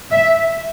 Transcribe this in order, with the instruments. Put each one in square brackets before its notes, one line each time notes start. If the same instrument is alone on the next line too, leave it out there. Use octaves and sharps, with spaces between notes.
[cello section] E5